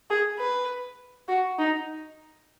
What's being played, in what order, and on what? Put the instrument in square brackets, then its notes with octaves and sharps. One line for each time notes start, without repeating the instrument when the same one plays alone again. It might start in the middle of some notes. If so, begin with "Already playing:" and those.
[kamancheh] G#4
B4
F#4
D#4